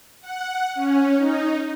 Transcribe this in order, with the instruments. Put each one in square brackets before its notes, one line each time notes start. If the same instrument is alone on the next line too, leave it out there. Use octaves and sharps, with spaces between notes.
[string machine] F#5
C#4
D#4